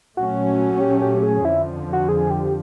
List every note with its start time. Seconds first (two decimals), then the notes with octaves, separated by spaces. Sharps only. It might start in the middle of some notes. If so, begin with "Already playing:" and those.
0.17 A#2 F#3 A3 C#4 F#4
0.80 G4
1.02 G4
1.23 G#4
1.45 F2 D3 F3 E4
1.93 F#4
2.09 G#4
2.30 G4